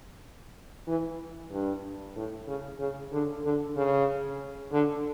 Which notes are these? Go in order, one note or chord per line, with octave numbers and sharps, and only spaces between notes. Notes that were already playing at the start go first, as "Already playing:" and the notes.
E3
G2
A2
C#3
C#3
D3
D3
C#3
D3